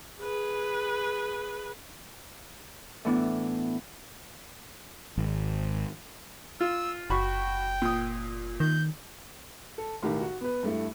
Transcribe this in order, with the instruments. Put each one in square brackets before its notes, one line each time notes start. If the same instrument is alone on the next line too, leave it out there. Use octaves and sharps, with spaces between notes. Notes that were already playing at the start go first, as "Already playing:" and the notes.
[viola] G#4 B4
[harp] A2 E3 B3 D4
[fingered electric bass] G#1
[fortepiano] F4 [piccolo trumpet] E6
[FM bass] F#1 [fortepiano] F#4 B5 C#6 [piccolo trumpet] G5
[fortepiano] A#2 D#6
[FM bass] D#3 [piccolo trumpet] G6
[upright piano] A4
B1 A2 D#3 G4
F#4
B3 B4
G2 A3 E4